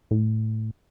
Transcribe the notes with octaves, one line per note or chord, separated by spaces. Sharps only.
A2